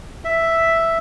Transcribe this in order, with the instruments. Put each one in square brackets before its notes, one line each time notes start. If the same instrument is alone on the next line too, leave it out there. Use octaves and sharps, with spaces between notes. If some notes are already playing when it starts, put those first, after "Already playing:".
[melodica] E5